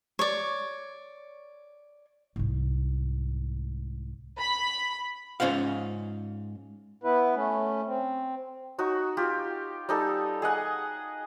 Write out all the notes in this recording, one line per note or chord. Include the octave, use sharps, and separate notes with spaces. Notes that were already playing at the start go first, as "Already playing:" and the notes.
C#5 D5
C2 G#2
B5
G#2 C#4 F4 C5 F5
B3 E4 B4
A3 C#4
C4
D#4 F#4 C#5
F4 G4
G3 D#4 A4
G#4 D#5 F#5